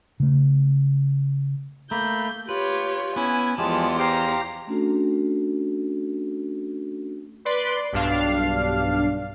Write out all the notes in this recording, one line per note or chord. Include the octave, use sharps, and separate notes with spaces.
C#3 A3
A3 A#3 A#5 B5 G6
F4 G4 B4 C#5
B3 C#4 E4 G#5
E2 F3 G#3 F4 G4 G#4 A5
G4 C5 F5 A#5 D6
A3 C#4 D4 F#4 A4
B4 D5 C6
B1 G2 D4 F5